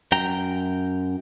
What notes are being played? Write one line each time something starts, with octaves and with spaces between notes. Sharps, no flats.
F#2 G5 A#5